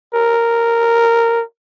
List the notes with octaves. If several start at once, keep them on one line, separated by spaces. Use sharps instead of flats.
A#4